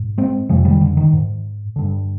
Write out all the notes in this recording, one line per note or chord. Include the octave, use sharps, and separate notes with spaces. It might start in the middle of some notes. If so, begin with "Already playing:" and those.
Already playing: G#2
G#3 C4
F2 C3 F3 G#3
D#3 G3
D3
D#3
G#2
G2 D3